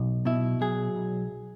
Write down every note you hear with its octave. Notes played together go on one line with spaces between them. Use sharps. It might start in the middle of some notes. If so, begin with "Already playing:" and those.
Already playing: B1
B2 E4
F#3 G#4
B1